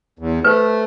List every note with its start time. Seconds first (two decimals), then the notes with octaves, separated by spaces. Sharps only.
0.19 E2
0.45 A3 B4 C5